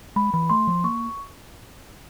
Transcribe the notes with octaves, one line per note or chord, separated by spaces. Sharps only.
G#3 B5
E3 B5
A3 C6
F3
A#3 C#6